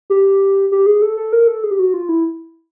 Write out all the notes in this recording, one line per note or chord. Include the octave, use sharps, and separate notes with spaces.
G4
G4
G#4
A4
A4
A#4
A4
G#4
G4
F#4
F4
E4